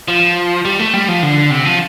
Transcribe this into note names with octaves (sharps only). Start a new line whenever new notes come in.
F3
G3
A3
G3
F3
D3
C3
F3